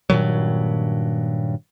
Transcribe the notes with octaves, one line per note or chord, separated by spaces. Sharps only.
G2 A#2 D#3 F#3